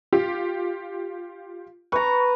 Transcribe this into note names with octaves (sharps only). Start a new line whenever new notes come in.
F4 G4
B4 A#5 C#6